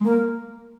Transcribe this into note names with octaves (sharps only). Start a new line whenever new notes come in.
G#3
A#3 A#4